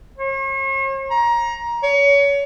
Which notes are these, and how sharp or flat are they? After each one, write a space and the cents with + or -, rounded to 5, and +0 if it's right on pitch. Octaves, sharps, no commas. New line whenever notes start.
C#5 -45
A#5 +20
C#5 +30